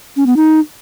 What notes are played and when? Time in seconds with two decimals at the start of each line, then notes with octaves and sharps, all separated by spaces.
0.16 C#4
0.26 B3
0.36 D#4